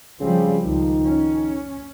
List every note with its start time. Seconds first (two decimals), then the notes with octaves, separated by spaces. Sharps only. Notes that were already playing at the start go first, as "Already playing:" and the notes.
0.21 C#3 F3 G3 C4
0.64 C#2 D#3 F3
1.05 C#4